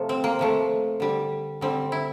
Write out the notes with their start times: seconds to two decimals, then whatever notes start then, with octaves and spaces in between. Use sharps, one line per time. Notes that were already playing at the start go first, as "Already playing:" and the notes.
Already playing: C3 F3 A3
0.09 C4
0.24 A#3
0.39 C3 F3 A3
1.00 D3 G3
1.61 D3 G3 C4
1.92 E4